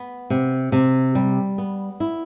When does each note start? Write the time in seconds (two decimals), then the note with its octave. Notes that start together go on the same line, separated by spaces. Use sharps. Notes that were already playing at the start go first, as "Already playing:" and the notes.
Already playing: B3
0.30 C3
0.72 C3
1.15 G3
1.58 B3
2.00 E4